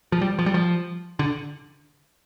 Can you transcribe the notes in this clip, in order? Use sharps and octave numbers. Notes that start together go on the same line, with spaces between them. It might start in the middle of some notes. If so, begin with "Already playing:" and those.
F3
G3
F3
G3
F3
D3